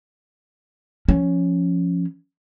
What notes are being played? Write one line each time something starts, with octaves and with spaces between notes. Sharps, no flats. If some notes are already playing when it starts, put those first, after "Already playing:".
F3 C#4